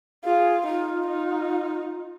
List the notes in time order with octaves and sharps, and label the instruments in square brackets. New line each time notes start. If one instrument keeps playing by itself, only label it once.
[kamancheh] F4 [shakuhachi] G#4
[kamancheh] D#4 [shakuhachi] F4
[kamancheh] D#4